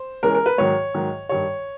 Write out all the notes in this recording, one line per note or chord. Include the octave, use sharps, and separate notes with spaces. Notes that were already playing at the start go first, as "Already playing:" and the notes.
Already playing: C5
E3 G#3 C#4 A#4
A#4
B4
G#2 D#3 F#3 C#5
G#2 D#3 F#3
G2 D#3 G3 C#5